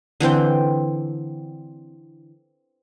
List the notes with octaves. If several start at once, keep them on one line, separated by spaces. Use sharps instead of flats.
D3 E3 C4 G5